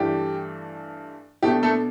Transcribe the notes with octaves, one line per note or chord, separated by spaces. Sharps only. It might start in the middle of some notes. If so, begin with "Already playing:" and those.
Already playing: G2 E3 A3 D4 G4
B2 A3 D4 G4
A3 A4